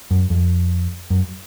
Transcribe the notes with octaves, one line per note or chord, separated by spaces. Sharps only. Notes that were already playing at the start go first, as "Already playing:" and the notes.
F#2
F2
F#2